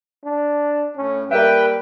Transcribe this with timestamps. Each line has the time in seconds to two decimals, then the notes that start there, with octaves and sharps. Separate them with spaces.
0.25 D4
0.96 A2 C#4
1.31 G3 A#3 B4 E5 G5